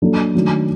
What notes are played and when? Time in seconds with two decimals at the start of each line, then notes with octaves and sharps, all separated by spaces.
0.02 F#3 A#3 D4 A4
0.35 D#3 F#3 A3 D4